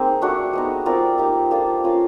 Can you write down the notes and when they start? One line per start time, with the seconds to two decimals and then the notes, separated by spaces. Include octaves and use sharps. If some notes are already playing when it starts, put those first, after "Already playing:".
Already playing: G#3 A#3 C4 D#4
0.22 A3 D4 F#4
0.53 G#3 B3 D#4
0.86 C4 F4 A#4 D5
1.18 A#3 D#4 G4
1.51 A#3 D4 F4 A4
1.84 C#4 F4 A#4